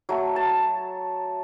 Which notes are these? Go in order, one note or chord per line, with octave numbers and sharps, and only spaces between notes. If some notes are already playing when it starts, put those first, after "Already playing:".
F#3 A3
A5